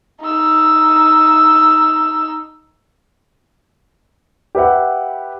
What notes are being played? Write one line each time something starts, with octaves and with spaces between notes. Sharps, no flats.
D#4 E6
G4 B4 E5 F#5